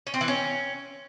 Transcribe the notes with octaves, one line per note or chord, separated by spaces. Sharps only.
C#4
C4
E3
C#4